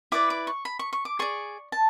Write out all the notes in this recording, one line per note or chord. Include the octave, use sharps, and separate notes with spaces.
E4 B4 D5 D6
D6
C#6
B5
C#6
C#6
D6
G#4 D5 C#6
A5